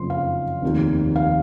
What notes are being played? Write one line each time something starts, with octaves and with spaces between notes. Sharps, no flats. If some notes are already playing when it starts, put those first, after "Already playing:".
Already playing: F#1 F2 C#3 F#3 C6
F5
F1 D#2 D#3
F5